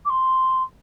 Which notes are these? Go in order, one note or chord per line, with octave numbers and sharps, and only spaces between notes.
D6
C6